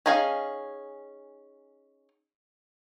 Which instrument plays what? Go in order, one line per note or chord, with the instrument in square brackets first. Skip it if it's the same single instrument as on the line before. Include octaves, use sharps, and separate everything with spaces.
[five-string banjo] C#4 D#4 G#4 F5 G#5